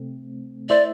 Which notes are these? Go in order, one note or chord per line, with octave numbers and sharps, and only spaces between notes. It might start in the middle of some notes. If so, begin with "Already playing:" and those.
Already playing: C3 A3 C4
A3 E4 C5 D5 E5